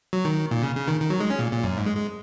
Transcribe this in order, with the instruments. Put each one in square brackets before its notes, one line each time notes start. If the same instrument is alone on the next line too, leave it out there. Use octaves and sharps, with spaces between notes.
[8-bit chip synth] F#3
D#3
A#2
C#3
C#3
D#3
D#3
F#3
G#3
C#4
A#2
A#2
F#2
G#2
G#3
G#3